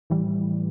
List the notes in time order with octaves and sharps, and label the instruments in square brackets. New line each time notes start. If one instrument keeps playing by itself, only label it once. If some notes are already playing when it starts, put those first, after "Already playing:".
[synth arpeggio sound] A2 E3 G3